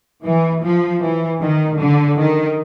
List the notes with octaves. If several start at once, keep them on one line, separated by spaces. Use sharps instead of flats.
E3
F3
E3
D#3
D3
D#3